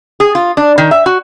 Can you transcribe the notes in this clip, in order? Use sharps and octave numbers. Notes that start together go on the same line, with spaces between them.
G#4
F4
D4
D#3
E5
F#4